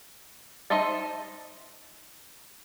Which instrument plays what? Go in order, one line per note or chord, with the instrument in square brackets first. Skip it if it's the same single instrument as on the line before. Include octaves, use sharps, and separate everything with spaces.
[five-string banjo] D#4 C5 D#5 E5 A5